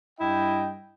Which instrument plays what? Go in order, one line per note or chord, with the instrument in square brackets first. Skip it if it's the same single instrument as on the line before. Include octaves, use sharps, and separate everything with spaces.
[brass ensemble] G2 D#5 G5 [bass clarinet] E4